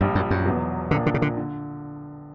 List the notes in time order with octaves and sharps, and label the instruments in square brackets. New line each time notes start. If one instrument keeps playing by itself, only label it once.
[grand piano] A#1 A#2 G3 [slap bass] G2
[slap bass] F#2
F#2
[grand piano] E1 E2 B2 F#3
[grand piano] A#1 A#2 A#3 D4 [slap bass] D3
[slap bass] D3
C#3
D3
[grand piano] D3